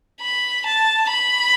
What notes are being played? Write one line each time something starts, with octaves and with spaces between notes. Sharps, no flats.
B5
A5
B5